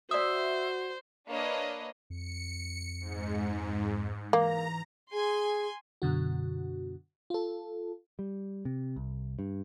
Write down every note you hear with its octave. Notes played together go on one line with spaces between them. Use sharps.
F#4 C5 D5 E5 D#6
A#3 D4 B4 C#5 D#5
F2 C#7
G#2
E3 A#3 A#5
G#4 G#5 C6
F#2 B2 D3 F#4
F4 A4
G3
C3
C2
G2